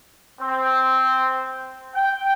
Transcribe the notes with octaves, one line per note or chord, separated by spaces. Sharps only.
C4
G5